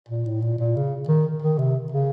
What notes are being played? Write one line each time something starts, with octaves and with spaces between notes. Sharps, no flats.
A#2
A2
A#2
A#2
C#3
D#3
D#3
C3
C#3